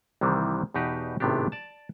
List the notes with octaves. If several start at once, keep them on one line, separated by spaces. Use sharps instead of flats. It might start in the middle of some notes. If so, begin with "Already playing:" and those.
C2 C3 D#3 E3 G3
E2 B2 D#4 G4 B4
G#1 A2 C3 B3 D4 G4
D5 A5